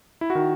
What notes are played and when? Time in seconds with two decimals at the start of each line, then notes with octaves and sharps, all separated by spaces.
0.21 E4
0.30 F#4
0.35 D#3